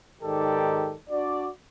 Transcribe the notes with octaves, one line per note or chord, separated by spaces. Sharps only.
G#2 D#3 G4 A4 D5
D4 F#4 D5